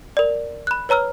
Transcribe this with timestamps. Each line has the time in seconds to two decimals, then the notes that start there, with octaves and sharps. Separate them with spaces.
0.17 A#4 D5
0.67 B5 F#6
0.89 B4 C#5 A#5 E6 F6